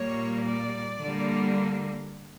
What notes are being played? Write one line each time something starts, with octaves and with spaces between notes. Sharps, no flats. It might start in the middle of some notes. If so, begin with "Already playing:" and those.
Already playing: A#2 G3 A#3 C#5
D5
D3 G3 A#3